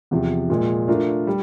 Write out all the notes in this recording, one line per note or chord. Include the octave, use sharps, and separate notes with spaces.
E2 C3 F3
A#2 F3 G#3
A3 D4 F4 A#4
G3